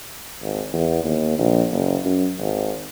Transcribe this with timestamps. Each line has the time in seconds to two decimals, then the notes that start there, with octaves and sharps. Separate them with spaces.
0.42 G#1
0.73 E2
1.04 D#2
1.39 A#1
1.72 F#1
2.05 F#2
2.39 G#1